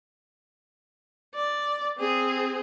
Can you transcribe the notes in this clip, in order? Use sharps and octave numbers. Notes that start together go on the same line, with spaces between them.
D5
C4 G#4